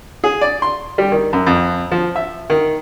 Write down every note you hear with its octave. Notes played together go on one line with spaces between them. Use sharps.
G#4
D5
C6
G3
D#3
F#2
F2
F3
E5
D#3